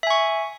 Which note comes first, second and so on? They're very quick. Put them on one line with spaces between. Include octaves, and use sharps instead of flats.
E5 G#5 C#6